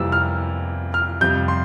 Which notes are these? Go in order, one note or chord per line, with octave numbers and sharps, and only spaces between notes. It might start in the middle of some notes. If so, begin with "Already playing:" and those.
Already playing: F2 C3 E3 G3 A#3 E6
F6
F6
F2 C3 G3 G6
C6